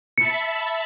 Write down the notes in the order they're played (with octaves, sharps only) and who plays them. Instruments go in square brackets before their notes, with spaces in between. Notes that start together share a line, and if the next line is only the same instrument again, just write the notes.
[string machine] E5 A5 B5 [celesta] C#7